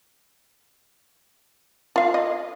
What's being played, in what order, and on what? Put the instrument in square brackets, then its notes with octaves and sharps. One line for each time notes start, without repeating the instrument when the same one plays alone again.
[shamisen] F4 F5
D#5